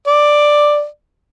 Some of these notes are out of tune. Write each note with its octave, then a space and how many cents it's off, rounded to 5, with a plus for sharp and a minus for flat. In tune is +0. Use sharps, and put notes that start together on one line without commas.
D5 +5